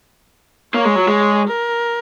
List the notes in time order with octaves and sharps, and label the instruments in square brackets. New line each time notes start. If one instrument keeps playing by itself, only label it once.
[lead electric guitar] A#3 [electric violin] C#5
[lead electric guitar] G#3
F#3
G#3
[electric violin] A#4